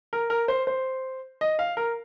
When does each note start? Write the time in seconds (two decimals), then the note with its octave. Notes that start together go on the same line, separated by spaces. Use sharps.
0.13 A#4
0.30 A#4
0.48 C5
0.67 C5
1.41 D#5
1.59 F5
1.77 A#4